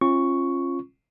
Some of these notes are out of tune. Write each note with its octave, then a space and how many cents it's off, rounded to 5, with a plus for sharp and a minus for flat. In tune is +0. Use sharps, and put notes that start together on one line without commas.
C#4 -40 F4 -10 C#6 +0